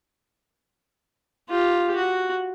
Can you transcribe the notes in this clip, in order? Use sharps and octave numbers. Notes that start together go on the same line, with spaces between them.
F4 G4
F#4